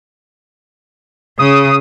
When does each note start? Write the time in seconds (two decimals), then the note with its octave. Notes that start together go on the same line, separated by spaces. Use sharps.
1.39 C#3 D#6